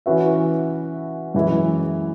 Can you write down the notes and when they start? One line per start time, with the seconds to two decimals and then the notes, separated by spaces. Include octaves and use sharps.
0.06 E3 C#4 F#4 B4 E5
1.34 F#2 E3 G#3 E4